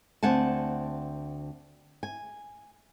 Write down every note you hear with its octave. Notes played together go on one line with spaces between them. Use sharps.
D2 C4 F#5 G#5 A5
G#5